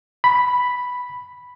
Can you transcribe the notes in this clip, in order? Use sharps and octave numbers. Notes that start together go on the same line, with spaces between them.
B5